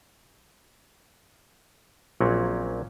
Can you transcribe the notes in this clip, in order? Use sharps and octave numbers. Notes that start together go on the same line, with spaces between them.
A#1 A#2 F#3 C4 C#4